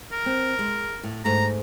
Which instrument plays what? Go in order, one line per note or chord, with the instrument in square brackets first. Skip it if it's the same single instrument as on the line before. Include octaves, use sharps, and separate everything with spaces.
[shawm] A#4
[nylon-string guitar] C4
G#3
A2
[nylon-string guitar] G#2 A3 [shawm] A#5